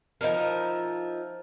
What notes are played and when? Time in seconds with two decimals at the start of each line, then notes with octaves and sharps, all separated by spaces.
0.21 F3 D#4 E4 A#4